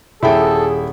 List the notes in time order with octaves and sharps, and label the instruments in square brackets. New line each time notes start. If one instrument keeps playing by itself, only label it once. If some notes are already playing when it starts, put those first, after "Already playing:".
[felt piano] D#1 G5 [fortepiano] E4 [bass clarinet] G#4 [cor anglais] A4